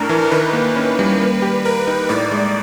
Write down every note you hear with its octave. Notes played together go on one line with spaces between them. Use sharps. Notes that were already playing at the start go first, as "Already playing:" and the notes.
Already playing: A2 A3 D4 A#4
E3
D#3 B4
A#3
C#4
G3
A#3
G4
A#4 B4
D#4
A2 D5
G#3